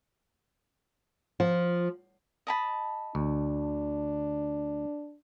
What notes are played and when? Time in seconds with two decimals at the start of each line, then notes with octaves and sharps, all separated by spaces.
1.40 F3
2.47 D#5 A5 B5
3.15 D2 D4